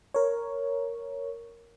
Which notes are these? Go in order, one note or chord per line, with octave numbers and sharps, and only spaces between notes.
A#4 C#5